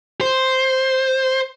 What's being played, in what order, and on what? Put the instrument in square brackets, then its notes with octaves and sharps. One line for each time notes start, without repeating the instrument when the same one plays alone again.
[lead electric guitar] C5